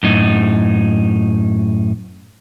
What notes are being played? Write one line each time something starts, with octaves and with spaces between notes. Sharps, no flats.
F#2 A2 D#4